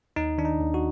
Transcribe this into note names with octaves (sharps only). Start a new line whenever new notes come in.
D#2 D#4
D#3 D4
D#4
D#2
F#4